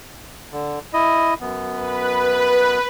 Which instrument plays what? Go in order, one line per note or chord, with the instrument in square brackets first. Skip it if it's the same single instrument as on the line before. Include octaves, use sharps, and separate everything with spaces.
[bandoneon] D3
E4 D#5
F#2 B3
[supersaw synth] B4